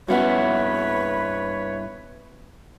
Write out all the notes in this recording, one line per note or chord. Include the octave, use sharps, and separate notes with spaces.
G2 B3 C#4 E4 F#4 B4 C#5 F#5